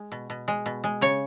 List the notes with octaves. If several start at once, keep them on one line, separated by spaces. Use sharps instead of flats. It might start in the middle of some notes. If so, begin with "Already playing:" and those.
Already playing: G#3
B2
B2
G#3
B2
G#3
C#3 C#5